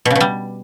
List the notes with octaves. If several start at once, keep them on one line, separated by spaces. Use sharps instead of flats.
B2
C#3
B2
G3